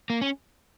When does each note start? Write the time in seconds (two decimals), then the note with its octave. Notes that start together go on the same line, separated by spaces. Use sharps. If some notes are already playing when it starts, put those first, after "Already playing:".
0.10 A#3
0.22 C#4